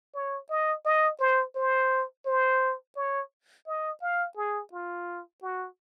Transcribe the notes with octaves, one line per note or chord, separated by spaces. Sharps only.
C#5
D#5
D#5
C5
C5
C5
C#5
D#5
F5
G#4
F4
F#4